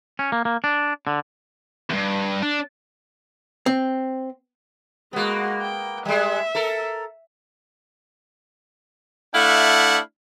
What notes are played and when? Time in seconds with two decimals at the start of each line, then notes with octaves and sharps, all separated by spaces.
0.19 C#4
0.32 A#3
0.45 A#3
0.64 D4
1.07 D3
1.90 E2 G2
2.42 D4
3.66 C4
5.13 G#3 A#3 B3 F#4
5.61 G5
6.05 G3 G#3 E5
6.55 A4 A#4
9.34 A3 D4 E4 F5 F#5